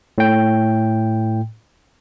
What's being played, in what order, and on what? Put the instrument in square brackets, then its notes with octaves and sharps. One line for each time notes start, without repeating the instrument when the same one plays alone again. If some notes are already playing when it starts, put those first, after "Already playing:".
[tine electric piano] A2 G5